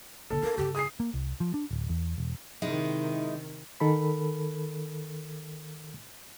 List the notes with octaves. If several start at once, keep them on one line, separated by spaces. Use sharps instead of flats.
A#1 C#3 A4
D4 A#4
G2 C#3 G4
G#4 D#6 C7
A#3
C2
F3
D4
D1
E2
E1
C3 D#3 G#3 D#4 E4
D#3 A4 A#4 B5